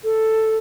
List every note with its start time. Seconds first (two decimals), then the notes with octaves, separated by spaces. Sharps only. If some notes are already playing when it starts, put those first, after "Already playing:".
0.04 A4